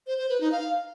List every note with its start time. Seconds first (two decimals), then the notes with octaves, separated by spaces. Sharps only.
0.07 C5
0.18 C5
0.29 B4
0.41 D#4
0.52 F5